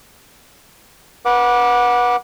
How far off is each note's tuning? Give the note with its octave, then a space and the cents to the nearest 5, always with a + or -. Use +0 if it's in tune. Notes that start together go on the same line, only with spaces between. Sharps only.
B4 -25 F#5 -20 D6 +0